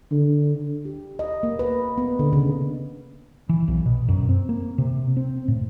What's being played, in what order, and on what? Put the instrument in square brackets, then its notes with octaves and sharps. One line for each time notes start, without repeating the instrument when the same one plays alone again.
[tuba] D3
[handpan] G4
D#5
A#3
B4
B3
D3
C#3
[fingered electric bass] E3
B1
B2
F#2
C4
A#3
C3
C4
A2